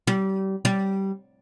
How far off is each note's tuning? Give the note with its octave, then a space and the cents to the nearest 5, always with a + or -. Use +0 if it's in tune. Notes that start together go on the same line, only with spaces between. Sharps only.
G3 -30
G3 -15